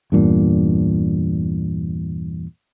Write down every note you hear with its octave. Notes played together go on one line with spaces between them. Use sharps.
E2 G2 A#2